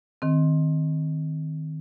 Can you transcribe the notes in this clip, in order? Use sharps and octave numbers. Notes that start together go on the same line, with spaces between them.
D#3 C4